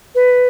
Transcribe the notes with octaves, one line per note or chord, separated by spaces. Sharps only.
B4